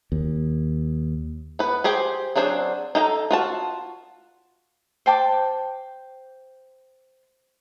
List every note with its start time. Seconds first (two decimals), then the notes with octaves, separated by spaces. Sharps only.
0.12 D#2
1.59 B3 B4
1.84 G4 G#4 C5 G5
2.36 F#3 C4 D4 G#4 C5
2.95 D#4 A4 G5 A#5
3.31 F4 F#4 A5
5.06 C5 G5 A5 D6